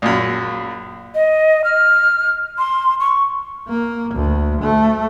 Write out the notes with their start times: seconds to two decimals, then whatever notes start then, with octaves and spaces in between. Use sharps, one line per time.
0.02 A#1 F#2
1.15 D#5
1.64 F6
2.58 C6
3.00 C#6
3.68 A#3
4.15 D2
4.62 A3